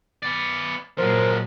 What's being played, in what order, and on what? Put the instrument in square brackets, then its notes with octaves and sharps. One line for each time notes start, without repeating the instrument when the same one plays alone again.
[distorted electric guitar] B3 D5
[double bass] A#2 F#3 [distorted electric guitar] F3 G#3 [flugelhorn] A#4 [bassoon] C5